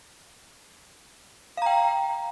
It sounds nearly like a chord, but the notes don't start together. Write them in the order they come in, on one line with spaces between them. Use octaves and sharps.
F5 A#5 G5